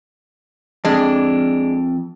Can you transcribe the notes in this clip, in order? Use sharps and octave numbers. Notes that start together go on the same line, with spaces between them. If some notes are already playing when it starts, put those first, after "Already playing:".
F2 G#3 D4